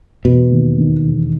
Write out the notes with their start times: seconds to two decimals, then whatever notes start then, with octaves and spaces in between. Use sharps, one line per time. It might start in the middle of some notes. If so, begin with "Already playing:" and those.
0.25 E1 B2
0.52 D#2
0.78 D#3
1.05 E1